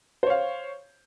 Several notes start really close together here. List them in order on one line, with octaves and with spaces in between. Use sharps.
C5 C#5 F5